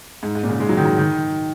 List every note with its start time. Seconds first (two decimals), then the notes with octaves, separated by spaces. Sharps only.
0.23 G#2
0.35 G#2
0.43 A#2
0.49 C#3
0.60 G#3
0.69 F#3
0.77 D#3
0.85 F#3
0.98 D#3